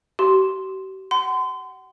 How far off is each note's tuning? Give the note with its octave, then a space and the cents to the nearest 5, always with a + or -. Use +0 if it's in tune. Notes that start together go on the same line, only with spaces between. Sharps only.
G4 -45 C6 +0
F#5 +25 C6 -35